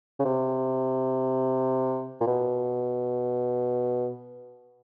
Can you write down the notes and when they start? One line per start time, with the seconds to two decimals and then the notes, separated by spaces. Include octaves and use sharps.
0.19 C#3
0.25 C3
2.20 A#2
2.27 B2